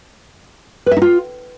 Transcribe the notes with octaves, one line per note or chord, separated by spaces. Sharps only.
B4
E5
D#4
F4